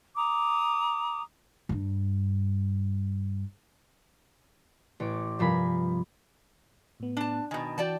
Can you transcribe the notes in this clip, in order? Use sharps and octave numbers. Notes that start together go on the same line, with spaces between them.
A#5 D6 D#6
G2 D4
A1 C#5 D6
G2 C3 F3 A#4 G#5 B5
A2 B3
D4 A5
B2 D#3 G#5
E3 F#4 D5 G5 A5 G6